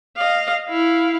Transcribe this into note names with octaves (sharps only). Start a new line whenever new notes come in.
D#5 F5
E4 F5